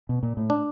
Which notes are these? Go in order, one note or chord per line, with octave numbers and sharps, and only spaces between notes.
B2
A#2
A2
D4